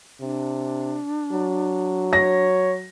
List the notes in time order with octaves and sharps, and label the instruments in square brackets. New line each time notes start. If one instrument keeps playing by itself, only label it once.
[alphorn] C3 [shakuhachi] D4
[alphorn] F#3
[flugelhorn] C#5 [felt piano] A#6